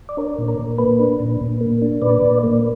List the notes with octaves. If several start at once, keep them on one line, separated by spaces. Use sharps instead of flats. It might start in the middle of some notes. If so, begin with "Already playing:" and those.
D5
D4 A#4 C#5
A#2
A#4
A#2
A#3 B4
D4
A#2
A#2
A#3
D4
A#2 B4 D5
A#2
A#3